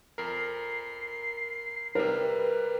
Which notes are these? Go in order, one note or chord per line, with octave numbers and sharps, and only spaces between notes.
F2 A#4 C7
C3 G3 A#4 B4